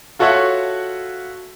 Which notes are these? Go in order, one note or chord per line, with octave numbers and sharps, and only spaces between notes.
F4 F#4 A4 C#5 E5 F#5